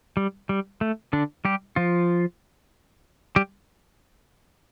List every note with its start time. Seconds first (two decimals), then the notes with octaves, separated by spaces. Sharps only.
0.17 G3
0.49 G3
0.81 A3
1.13 D3 D4
1.45 G3 G4
1.76 F3 F4
3.36 G3 G4